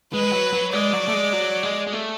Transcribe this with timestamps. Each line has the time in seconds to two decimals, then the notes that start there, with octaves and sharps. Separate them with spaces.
0.13 G#3 B4
0.23 G#3
0.33 F#3
0.53 F#3
0.73 G#3 D5
0.93 F#3
1.08 A3
1.13 G#3
1.33 F#3
1.63 G#3
1.87 G#3
1.93 A3